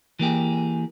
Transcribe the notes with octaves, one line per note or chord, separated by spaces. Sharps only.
E3 A#3 G4 G#4